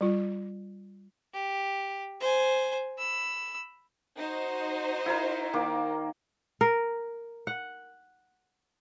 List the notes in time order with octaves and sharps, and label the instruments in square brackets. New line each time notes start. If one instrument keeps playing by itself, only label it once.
[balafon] G3 F4
[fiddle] G4
C5 G#5
B5 E6
[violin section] D#4 F#4 C5
[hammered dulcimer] E4 A#4
D#3 A#3 D6
[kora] A#4
F#5